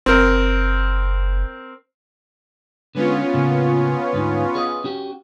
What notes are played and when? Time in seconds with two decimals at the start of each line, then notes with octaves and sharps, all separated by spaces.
0.06 F#1 C4 A#4
2.95 D3 G#3 B3 C#4 F4
3.34 A2 C#3 A#3
4.13 D2 G#2 D#4
4.55 G#4 B4 D#5
4.84 C#4 F#4 G4